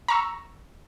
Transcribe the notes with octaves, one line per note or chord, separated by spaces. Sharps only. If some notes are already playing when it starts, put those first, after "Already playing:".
A#5 C#6 E6